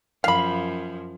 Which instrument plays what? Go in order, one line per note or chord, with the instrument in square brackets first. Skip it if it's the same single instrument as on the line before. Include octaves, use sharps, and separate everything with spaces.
[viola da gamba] F#2 F3 [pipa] F5 B5